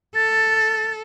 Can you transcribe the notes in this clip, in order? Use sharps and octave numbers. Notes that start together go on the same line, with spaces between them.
A4 A6